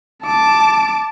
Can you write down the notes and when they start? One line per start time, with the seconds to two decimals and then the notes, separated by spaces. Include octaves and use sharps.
0.23 A5 D6